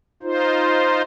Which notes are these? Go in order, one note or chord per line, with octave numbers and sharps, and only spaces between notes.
D#4 F4 C5